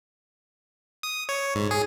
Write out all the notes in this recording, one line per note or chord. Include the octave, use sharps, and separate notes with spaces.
D#6
C#5
G#2
G#4